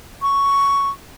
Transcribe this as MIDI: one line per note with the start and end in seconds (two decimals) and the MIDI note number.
0.22 0.90 85